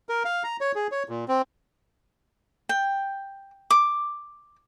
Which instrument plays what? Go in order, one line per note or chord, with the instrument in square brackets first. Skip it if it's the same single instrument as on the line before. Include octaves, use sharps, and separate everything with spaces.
[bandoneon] A#4
F5
A#5
C#5
G#4
C#5
A#2
C4
[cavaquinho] G5
D6